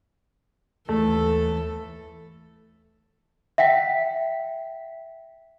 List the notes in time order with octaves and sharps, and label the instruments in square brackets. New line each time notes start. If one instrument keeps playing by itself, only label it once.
[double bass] D#2 E3 [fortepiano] A3 [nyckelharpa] A4
[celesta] E5 F#5 G5 B6